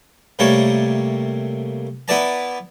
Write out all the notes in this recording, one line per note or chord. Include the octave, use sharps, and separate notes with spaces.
C3 G3 A3 A#3 C#5 A5
B3 E4 B4 D5 A5 A#5